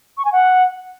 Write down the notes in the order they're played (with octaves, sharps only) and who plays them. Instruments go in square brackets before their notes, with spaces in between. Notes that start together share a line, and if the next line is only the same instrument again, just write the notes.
[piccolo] C#6
G#5
F#5